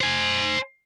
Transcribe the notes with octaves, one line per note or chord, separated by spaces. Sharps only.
C5 G#5